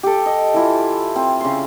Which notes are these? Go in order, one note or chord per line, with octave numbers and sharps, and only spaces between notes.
G4 A4
D#5
E3 E4 F4
C4
C#3 C6